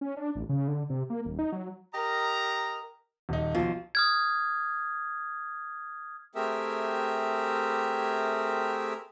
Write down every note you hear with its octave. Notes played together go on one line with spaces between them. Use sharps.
C#4
D4
A1
C#3
D3
C3
A#3
D#1
D#4
F#3
G4 A#4 D#5 A#5
D#1 D#4
B1 F3
D#6 F6 G#6
A3 C4 G4 G#4 A#4 E5